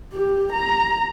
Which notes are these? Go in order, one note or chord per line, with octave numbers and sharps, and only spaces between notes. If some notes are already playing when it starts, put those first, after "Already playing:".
G4
A#5